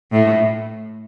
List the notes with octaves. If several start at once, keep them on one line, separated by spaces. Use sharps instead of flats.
A2